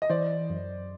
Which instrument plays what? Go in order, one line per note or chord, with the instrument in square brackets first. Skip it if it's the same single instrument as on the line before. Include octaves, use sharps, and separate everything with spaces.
[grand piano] D#5
[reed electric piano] E3 [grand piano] C5 D5
[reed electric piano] F#2